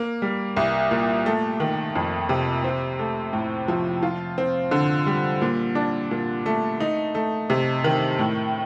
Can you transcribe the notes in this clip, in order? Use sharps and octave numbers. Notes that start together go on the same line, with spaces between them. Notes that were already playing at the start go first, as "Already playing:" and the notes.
Already playing: A#3
G3
C2
A#2
A3
D#3
F2
C3
C4
A3
A2
F3
F4
C4
D3
G3
A#2
D4
A#2
A3
D#4
A3
C3
D#3
A2